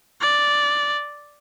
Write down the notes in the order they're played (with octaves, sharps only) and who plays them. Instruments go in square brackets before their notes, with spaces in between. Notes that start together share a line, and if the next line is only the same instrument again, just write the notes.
[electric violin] D5